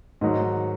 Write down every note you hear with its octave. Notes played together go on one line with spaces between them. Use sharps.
G#2 D#3 F#3 D#5